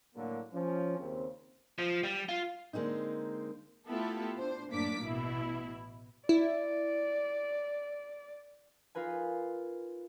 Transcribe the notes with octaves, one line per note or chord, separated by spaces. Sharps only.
A2 D3 F#3 A#3
F3 C#4
D#2 C#3 C4
F3
G3
F4
D3 G#3 A#3 C4 D#4
A3 B3 E4 F4 G4 A4
D4 C5
F#2 A2 A#3 D4 D6 B6
A1 B2 E4
E4 D5
D#4 F4 A#4 B4 G#5